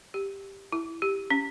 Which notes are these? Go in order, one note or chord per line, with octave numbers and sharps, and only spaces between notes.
G4
E4
G4
C#4